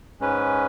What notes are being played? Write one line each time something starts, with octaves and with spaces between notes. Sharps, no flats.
G#2 G#3 C#4 B4